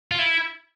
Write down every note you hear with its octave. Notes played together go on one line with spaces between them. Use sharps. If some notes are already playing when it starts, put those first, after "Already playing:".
F4
E4